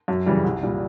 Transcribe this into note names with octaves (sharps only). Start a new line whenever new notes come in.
F#2
C#3 E3 G3
C2
A#2 G3